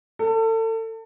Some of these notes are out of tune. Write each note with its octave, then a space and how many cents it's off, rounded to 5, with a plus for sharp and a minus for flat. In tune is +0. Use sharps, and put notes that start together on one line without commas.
A4 +30